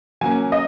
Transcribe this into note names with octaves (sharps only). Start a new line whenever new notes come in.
F#3 A#3 C#4 G#5
D#5